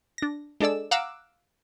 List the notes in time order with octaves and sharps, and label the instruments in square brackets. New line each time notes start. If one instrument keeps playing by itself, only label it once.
[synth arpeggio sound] D4 A#6
G#3 D4 A4 D5 E6
F5 F#5 A#5 D6 E6 F#6